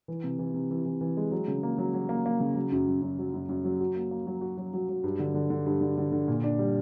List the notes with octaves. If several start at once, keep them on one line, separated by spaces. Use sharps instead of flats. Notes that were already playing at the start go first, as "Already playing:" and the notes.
E3
C3
E3
C3
E3
E3
E3
G#3
F#3
C#3
A#3
F#3
F#3
A#3
A#3
C#3
F#3
F#2
F#2
F#2
F#3
F#2
F#2
F#3
F#4
A#3
A#3
F#3
F#4
F#3
F#3
F#3
G2
D3
D3
D3
G2
D3
D3
D3
A#2
D4
G3